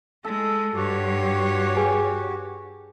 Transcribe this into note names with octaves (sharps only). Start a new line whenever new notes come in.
G#3 A4
G2 F#4 G4 C#5
G#4 B4 G#5